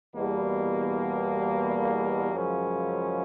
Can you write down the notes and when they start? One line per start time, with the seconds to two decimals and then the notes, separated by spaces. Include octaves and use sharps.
0.15 E2 B2 G3 A#3
2.33 F#2 C#3 F3 G#3 C#4